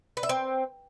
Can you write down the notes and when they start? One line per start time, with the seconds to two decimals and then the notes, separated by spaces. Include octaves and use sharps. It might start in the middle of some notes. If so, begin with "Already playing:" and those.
0.17 B4
0.23 E5
0.29 C4